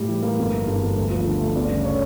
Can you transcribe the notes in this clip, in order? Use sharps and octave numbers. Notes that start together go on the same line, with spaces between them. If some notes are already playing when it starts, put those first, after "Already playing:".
Already playing: A2 G3
E3
A#3
G1
E3
G2
G1
D2
F3
D3
D2
G1 D5
C#3
C#5